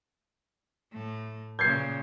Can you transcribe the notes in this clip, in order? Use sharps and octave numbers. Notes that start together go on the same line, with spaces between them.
A2 A3
A#2 C#3 G6 G#6 C7